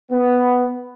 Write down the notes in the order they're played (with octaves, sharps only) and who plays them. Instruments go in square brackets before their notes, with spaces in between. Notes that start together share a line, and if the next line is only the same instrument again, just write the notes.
[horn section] B3